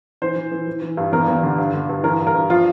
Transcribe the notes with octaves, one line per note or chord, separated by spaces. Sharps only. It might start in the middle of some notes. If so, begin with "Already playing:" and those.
E3 C5
E3
E3
E3
E3
G2
E2 A#4
E2
D3
G2
D3
G2
E3 A#4
G2
A#4
G2
F3 F4